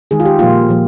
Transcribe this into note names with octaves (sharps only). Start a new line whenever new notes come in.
D#3 G#3 G#4
F4
G4
A#2 F3 A#3 F4
A#2 F3 A#3